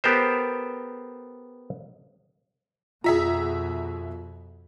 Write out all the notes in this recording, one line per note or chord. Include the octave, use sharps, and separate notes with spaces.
B3 G4 A4 A#4 C5
F2 B2 F4 G#4 E5 A#5 B6